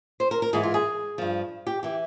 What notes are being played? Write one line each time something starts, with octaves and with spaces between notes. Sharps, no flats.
C5
A#4
A#4
G#2 E3 G#4
F4
G#4
G2 F3
G4
E3 G4